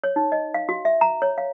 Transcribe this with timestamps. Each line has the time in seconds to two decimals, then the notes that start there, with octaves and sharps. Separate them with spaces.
0.04 C#5
0.16 D#4
0.32 D#5
0.54 F5
0.69 F#4
0.85 E5
1.01 A#5
1.22 C#5
1.38 F5